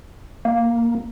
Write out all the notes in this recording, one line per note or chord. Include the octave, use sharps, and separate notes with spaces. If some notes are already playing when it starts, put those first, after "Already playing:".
A#3